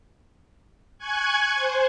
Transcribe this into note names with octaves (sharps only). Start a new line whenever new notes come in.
G#5 C#6 F#6 G#6
C5